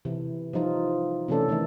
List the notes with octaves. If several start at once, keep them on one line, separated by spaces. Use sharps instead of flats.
C3 E3
F3 G3 D#4 F4
C3 E3 A3 C#4 A4 D5
D#3 E3 A3 D#4